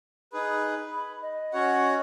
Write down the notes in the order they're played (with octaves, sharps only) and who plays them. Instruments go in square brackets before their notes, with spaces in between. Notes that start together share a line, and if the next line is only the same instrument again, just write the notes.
[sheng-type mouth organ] D#4 G#4 B4 [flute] B5
[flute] B5
D#5
[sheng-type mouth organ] C#4 F#4 C#5 F#5